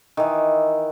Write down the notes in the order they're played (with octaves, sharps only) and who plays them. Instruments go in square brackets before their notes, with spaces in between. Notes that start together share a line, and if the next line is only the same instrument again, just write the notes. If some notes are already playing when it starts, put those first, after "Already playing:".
[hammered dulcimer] D#3 E3